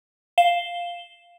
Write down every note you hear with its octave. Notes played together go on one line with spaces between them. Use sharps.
F5 E7 G7